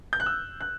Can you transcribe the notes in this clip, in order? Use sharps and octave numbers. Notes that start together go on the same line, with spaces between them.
G6
F#6
E6
F#6